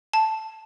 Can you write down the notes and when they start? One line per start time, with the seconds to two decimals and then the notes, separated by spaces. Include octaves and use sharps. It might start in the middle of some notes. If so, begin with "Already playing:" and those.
0.13 A5